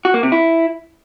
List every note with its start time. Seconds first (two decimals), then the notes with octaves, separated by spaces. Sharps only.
0.05 F#4
0.14 A#3
0.23 C3
0.32 E4